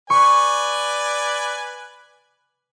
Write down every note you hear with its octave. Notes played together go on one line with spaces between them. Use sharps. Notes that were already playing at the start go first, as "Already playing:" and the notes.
B4 D5 G#5 C#6